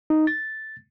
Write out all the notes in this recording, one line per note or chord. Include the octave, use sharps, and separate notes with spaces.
D#4
A6